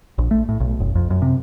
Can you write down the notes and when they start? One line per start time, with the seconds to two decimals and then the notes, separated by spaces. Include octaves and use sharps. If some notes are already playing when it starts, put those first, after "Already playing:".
0.18 A#1
0.31 A3
0.49 A2
0.60 B1
0.80 F#1
0.95 F2
1.10 F#2
1.22 C3